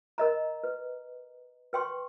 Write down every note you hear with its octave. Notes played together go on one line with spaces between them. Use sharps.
A#4 D#5 A#5
B4
B4 G5 C6 C#6